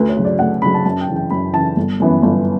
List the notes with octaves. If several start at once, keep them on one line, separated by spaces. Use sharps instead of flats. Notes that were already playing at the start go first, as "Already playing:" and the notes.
Already playing: D2 B4
C#5
C#3 F#3
D5
D2 F#5
C#3 F#3 B5
A5
F#2 A5
G5
C#3 E3
G5
F#2 B5
C#3 E3 A5
G1
F#2 E3 B3
G1